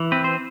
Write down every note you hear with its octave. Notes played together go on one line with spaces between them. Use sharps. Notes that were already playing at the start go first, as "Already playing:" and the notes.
Already playing: E3
C4 B4
C5